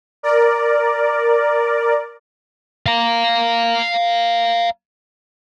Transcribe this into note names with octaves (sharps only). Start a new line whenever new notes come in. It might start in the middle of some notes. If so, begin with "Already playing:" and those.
A#4 D5
F5 A#5